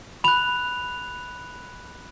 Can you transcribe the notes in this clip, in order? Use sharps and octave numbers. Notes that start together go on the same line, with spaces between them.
B5 F#6 F7